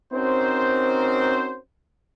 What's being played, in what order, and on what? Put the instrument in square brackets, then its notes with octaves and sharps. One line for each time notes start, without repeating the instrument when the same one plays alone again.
[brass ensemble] C4 C#4 D#4 F#4 A#4 C5